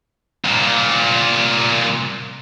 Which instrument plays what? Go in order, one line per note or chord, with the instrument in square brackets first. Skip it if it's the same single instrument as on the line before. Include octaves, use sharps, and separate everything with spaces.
[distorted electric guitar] C2 A#2